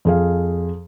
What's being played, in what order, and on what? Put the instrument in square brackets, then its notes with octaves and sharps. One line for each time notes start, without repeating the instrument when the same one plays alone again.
[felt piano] F2 G#4 F5